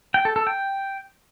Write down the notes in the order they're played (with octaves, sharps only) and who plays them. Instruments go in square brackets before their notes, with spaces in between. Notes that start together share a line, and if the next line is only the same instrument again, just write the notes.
[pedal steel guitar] G5
A4
A4
G5